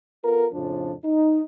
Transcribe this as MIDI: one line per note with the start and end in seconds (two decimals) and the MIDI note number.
0.24 0.46 59
0.24 0.46 65
0.24 0.46 69
0.24 0.46 70
0.53 0.94 41
0.53 0.94 45
0.53 0.94 49
0.53 0.94 53
0.53 0.94 62
1.04 1.41 63